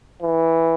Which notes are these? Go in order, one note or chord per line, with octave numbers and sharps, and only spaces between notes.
E3